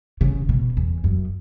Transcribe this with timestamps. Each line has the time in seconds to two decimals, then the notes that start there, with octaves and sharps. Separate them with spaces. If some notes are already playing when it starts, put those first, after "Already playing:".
0.21 C#3
0.49 B2
0.77 E2
1.04 F#2